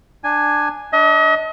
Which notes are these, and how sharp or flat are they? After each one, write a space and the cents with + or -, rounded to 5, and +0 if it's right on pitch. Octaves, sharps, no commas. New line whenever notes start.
D4 +15 G#5 +0
D4 +0 D#5 +40